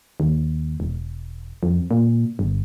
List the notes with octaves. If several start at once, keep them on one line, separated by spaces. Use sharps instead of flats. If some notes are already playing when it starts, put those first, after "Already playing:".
D#2
E1
F2
A#2
G1